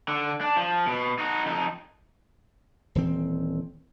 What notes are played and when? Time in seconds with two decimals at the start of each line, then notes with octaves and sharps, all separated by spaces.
0.08 D3
0.41 D4
0.57 F3
0.87 B2
1.19 D#4 F#4
1.46 F2 D#4
2.95 D#1 E3 C4